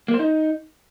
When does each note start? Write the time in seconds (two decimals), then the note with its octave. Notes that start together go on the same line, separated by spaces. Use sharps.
0.08 A#3
0.14 C5
0.19 D#4